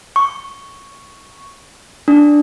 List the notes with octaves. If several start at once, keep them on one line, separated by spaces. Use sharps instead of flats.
C#6
D4